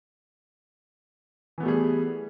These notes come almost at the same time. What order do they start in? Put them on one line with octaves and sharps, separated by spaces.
E3 B3 A3 G3 G#4